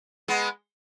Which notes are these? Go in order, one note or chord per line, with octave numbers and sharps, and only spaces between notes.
G#3 B3